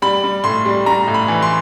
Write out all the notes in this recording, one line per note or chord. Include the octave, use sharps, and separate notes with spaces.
G3 B5
G3
A2 C6
G3
G3 A#5
A2
B5
E3
C6